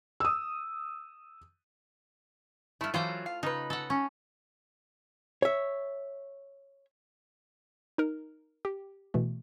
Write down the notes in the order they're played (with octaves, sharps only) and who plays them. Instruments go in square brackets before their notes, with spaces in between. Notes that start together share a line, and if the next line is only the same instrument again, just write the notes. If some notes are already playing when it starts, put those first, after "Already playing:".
[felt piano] D#6 E6
[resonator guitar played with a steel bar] G2 E4 [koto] A3
[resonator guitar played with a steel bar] E3 F#3 F5 [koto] F4 A4 C5
[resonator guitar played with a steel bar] F5
[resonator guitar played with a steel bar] C#3 B4 [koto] D#4
[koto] A4 F#5
C#4
[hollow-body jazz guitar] C#5 E5
[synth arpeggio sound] D#4 A#4
G4
B2 E3 A3